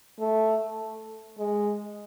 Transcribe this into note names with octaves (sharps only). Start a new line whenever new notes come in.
A3
G#3